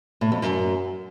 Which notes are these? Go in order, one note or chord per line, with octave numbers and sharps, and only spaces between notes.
A2
F2
F#2